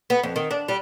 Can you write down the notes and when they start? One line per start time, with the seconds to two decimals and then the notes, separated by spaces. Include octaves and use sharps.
0.10 B3
0.23 F2
0.36 D#3
0.51 D4
0.68 G3